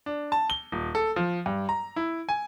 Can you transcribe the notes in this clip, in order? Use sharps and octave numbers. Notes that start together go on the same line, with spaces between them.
D4
A5
G7
D#1
A4
F3
G2
A#5
E4
G#5